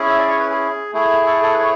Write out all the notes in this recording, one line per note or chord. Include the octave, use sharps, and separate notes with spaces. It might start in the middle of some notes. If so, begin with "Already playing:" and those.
Already playing: C#4 E4 G#4
E5
D5
C#5
B4
G#4
A3 E4 G#4
A4
A4
B4
C#5